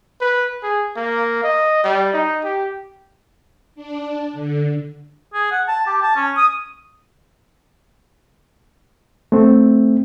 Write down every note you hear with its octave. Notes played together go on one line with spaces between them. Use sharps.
B4
G#4
A#3
D#5
G3
D#4
G4
D4
D3
G#4
F#5
A5
G4
A5
C#4
D#6
A3 C4